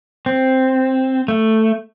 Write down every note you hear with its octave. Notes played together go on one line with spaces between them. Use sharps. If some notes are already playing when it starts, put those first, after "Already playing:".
C4
A3